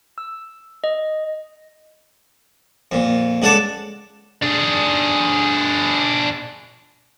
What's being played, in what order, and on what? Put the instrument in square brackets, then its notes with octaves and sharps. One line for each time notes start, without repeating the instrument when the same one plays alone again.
[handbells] E6
D#5
[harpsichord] F2 A#2
C#2 D4 F#4 A4 A5 D6
[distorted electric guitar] D4 G#4